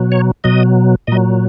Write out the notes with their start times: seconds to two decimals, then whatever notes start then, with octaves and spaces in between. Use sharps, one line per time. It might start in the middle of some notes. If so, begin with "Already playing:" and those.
Already playing: B2 F#3
0.12 C#5
0.44 B2 F#3 D#5
1.07 A#2 F#3 D#5